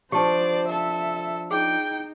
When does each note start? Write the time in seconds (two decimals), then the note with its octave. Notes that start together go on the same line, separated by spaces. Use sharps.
0.12 F3 D4 G4 C5 D5 A5
0.69 A4 E5
1.51 D#4 G#4 G5